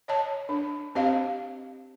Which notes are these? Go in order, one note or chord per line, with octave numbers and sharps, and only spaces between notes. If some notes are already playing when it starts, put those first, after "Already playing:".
C#5 D#5 A5
D4
C4 G4 C5 D#5 F5